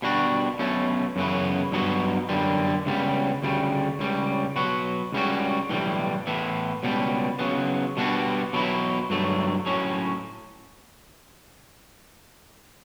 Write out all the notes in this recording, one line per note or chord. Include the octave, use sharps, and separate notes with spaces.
B2 G3 D4 F#4
B1 B2 A3 C#4
F#2 C#3 E3 B3
G2 F#3 B3 F#4
F#2 D3 G3
C#2 C#3 G3 B3
D2 C#3 G3
C#2 C#3 G3
B2 F#3 B3 F#4
C#2 C#3 G3 C#4 F#4
B1 A2 E3 G3
A2 E3 B3
C#2 B2 G3 B3
C#3 F#3 B3
B2 G3 B3 D4 F#4
B2 F#3 B3 E4
G2 F#3 A3
A2 F#3 C#4